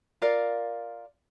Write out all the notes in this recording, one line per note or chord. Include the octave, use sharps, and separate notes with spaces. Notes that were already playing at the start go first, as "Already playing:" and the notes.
F4 A#4 D5 F5